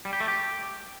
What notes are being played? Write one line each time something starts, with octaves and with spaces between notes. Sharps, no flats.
G3
G4
A3
G4